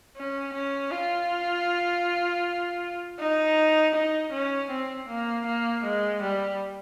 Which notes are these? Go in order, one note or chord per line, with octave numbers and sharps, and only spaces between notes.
C#4
C#4
F4
D#4
D#4
C#4
C4
A#3
A#3
G#3
G3